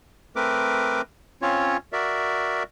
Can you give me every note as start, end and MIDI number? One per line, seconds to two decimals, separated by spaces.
0.36 1.01 57
0.36 1.01 60
0.36 1.01 70
0.36 1.01 71
0.36 1.01 86
1.42 1.77 60
1.42 1.77 61
1.42 1.77 65
1.42 1.77 73
1.93 2.63 66
1.93 2.63 70
1.93 2.63 74
1.93 2.63 76